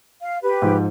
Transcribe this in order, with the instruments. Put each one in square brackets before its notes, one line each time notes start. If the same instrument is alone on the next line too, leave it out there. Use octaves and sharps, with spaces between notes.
[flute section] F5
G4 B4
[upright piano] G#2 F3